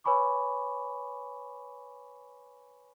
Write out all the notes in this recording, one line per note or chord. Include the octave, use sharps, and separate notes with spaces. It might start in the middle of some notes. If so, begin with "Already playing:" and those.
B4 C#5 G#5 B5 C#6 D6